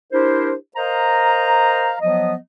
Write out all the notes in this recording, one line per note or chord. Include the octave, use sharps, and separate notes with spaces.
D4 E4 G4 A#4 C5
A#4 C5 D#5 F5 A#5
F3 F#3 B3 D#5